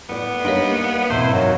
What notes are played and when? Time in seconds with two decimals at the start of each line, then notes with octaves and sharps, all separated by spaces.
0.09 A2 B3 D5
0.45 G3 A#3 D4 D#4 G4 C#5
1.10 E2 G#2 B2 C4 E4 C5
1.31 F#2 D#3 F#3 A3 F5